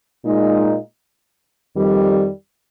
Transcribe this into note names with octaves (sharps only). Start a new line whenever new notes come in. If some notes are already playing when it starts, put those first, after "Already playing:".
A#2 G#3 D#4
F2 D#3 G3